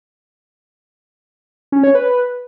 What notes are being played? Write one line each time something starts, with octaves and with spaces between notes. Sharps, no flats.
C#4
C#5
B4